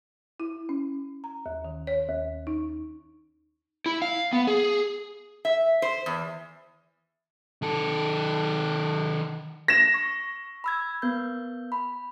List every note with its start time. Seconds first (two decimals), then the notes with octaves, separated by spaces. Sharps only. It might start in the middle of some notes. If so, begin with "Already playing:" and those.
0.40 E4
0.69 C#4
1.24 A#5
1.46 D#2
1.65 D#3
1.87 C#5
2.09 D#2
2.47 D#4
3.86 E4
4.02 F5
4.33 B3
4.47 G#4
5.45 E5
5.82 C5
6.06 E2
7.62 D#3 A4
9.68 A#6 E7
9.94 C#6
10.64 B5 E6 G#6
11.02 B3 A#4 G6
11.72 B5